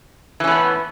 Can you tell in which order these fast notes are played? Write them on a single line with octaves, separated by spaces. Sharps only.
E3 C#4 A2 B3